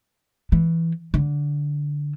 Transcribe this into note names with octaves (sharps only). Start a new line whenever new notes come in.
E3
D3